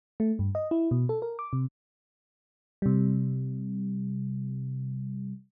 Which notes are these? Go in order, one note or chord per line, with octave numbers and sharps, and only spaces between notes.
A3
G2
D#5
E4
B2
A4
A#4
D6
C3
C3 G3